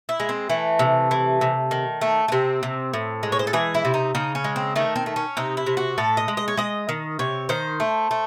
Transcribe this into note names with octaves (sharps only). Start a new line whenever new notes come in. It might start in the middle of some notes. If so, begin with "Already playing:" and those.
E4
G#3
C4
E3 A3
C3
E3
C3
D#3
A3
A3
C3 C4
C3
A2
G#3
C#5
C5
A4
E3 G#4
E4
C3
D#4
C#3 D#4
C#4
G#3
C4
D#3 A3
C4
A3
C#4
C3 D#4
E4
C3
F#4
A2 A4
D#5
G#3
D#5
C#5
G#3 D#5
D#3
C3 C#5
D#3 C5
A3
A3